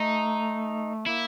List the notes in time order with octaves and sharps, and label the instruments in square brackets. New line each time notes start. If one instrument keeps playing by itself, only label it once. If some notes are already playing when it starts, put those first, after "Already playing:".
Already playing: [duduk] A3 [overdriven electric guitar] D#4
[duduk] A#3 [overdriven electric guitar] E4